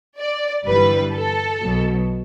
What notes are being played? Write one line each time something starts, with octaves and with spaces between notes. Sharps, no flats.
D5
G1 G2 E3 G3 B4
A4
B1 B2 F#3